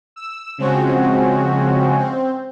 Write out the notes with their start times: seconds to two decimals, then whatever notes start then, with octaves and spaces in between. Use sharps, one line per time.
0.16 E6
0.58 C#3 F3 G#3 C4 C#4 F#4
1.99 C4